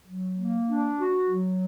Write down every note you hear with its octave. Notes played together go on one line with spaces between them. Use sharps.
F#3
A#3
D4
F#4
F#3